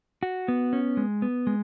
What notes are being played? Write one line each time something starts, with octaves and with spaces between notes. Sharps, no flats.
F#4
B3
C#4
G#3
B3
G#3